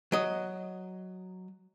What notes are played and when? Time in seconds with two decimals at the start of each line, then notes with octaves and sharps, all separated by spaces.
0.12 F#3 D#5